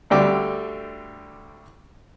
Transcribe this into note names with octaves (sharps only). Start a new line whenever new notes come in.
D2 D3 G3 G5 D6